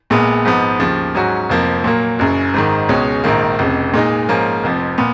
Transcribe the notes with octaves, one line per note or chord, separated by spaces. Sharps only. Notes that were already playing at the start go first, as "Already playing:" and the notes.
A#1 A#2 G#3 B3
G#1 G#2 F3 B3
D#2 C#3 F3
G#2 F#3 C#4 F#4
F1 F2 F3 A#3
A#2 F#3 A#3
F#1 F#2 C#3
G#1 G#2 D#3
C#2 B2 G#3 C#4
A#1 G#2 D#3 A#3
F1 F2 C#3
A#2 G#3 D#4
G#2 F3 A#3 C#4
F1 F2 F3
A#2 B3